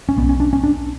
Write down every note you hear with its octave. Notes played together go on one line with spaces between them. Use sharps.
C#4
B1 B2 B3
C#4
D4
C#4
D4